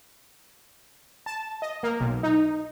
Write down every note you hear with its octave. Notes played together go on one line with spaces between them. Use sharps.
A5
D#5
A#3
B1
D#4